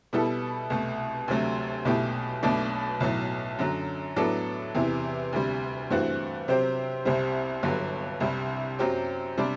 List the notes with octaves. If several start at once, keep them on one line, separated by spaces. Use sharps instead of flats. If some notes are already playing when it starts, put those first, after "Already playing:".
B2 G3 B3 E4 A4
C2 B2 A3
D2 C3 F#3 A3
B1 B2 A3 E4 G4
B1 B2 A3 D4
B1 A2 F#3 A3
F#2 D3 F#3
A2 F#3 B3 D4 A4
E2 C3 E3
D2 C3 G3
G2 E3 A3 C4 F#4
C3 F#3 C4 G4 C5
C2 C3 G3 C4
G1 G2 D3 F#3
C2 C3 G3
F#2 F#3 C4 G4
C3 G3 D4